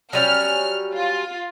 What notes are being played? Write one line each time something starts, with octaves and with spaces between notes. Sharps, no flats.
F#3 G3 C#4 F6
F4